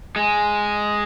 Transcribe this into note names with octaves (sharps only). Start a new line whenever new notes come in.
G#3